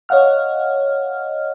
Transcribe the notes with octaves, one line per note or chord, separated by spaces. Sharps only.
C#5 D#5 F5 F#5 F6